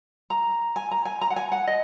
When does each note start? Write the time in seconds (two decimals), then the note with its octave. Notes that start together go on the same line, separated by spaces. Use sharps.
0.30 A#5
0.76 G#5
0.91 A#5
1.05 G#5
1.21 A#5
1.30 F#5
1.36 G#5
1.52 F#5
1.67 D#5